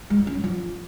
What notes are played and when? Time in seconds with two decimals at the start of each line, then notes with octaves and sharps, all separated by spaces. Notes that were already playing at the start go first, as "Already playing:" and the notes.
0.10 G#3
0.19 F4
0.27 C#4
0.35 F#3
0.44 F3